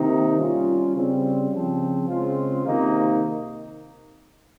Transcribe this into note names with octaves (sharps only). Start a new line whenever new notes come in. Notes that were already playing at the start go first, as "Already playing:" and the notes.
Already playing: C3 D#3 A#3 D#4
G3 C#4 F4
C#3 G3 C4
C#3 F3 C4
C#3 G#3 C4 F4
C3 D#3 A#3 D#4